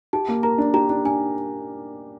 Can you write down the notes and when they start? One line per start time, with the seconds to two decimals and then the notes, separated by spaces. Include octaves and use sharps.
0.13 G4 A5
0.29 A#3
0.43 A#4 A#5
0.58 D4
0.74 G4 A#5
0.89 D4
1.05 D4 G#5